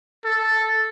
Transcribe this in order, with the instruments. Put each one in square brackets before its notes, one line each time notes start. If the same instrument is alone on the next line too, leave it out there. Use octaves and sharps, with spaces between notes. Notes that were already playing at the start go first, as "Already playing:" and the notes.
[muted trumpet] A4